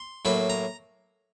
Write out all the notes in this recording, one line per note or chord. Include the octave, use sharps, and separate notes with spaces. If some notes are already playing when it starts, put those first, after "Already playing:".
Already playing: C6
A2 F#3 A#3 B5
A#5